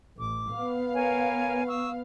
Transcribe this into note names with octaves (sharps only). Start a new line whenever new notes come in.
A1 D6
B3 F5
A#4 C#5 G#5
C#6 D#6 E6